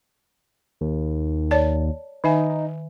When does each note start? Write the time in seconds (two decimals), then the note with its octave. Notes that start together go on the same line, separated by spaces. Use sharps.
0.81 D#2
1.51 C#5 D5 A5
2.24 D#3 D#4 E5 G#5